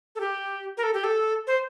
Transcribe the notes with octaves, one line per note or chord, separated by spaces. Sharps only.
A4
G4
A#4
A4
G4
A4
C5